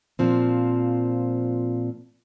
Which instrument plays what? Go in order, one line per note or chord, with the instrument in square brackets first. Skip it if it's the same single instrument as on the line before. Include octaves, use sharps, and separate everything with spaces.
[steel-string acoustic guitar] A#2 F3 C4